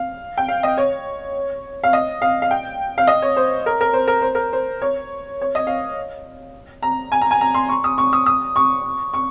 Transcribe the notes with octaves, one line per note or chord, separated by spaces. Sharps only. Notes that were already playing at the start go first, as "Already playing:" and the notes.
Already playing: F5
G5
F5
D#5
C#5
F5
D#5
F5
F5
G5
F5
D#5
C#5
C5
A#4
A#4
C5
A#4
C5
A#4
C5
C#5
C#5
D#5
F5
A#5
G#5
A#5
G#5
A#5
C6
C#6
D#6
C#6
D#6
D#6
C#6
C#6